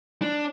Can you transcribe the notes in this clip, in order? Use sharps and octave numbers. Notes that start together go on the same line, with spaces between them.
D4